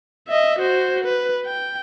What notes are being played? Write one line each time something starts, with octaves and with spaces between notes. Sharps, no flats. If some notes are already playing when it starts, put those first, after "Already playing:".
D#5 E5
F#4 C5
B4
G5